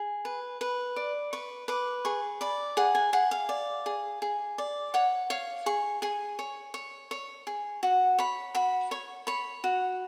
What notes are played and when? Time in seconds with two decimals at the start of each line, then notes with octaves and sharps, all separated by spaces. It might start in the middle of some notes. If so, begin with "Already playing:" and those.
Already playing: G#4
0.25 B4
0.61 B4
0.96 D5
1.33 B4 C#6
1.68 B4 D6
2.05 G#4 C#6
2.41 D5 B5
2.77 G#4 F#5
2.95 G#5
3.13 G#4 F#5
3.31 F5
3.49 D5
3.86 G#4
4.22 G#4
4.58 D5
4.94 C#5 F#5
5.30 C#5 F5
5.66 G#4 C#6
6.02 G#4 G#5
6.39 C#5
6.74 C#5
7.11 C#5
7.47 G#4
7.83 F#4 F#5
8.18 C#5 B5
8.55 F#4 B5
8.91 C#5 C#6
9.27 C#5 B5
9.64 F#4